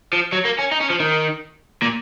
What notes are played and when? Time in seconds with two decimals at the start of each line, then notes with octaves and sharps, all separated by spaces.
0.13 F3
0.32 F#3
0.45 A#3
0.59 C#4
0.71 D#4
0.81 C#4
0.90 F3
1.00 D#3
1.82 A#2